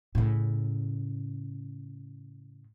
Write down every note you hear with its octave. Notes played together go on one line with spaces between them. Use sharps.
A2 C#3